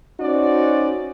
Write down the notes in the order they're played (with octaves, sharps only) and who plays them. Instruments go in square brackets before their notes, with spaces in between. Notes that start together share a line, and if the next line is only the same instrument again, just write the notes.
[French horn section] C#4 D#4 F#4 C5 D5